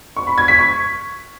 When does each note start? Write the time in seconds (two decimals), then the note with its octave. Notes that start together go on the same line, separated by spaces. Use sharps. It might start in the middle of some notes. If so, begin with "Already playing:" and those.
0.17 C#6
0.27 B5
0.38 G#6
0.48 B6
0.59 C#6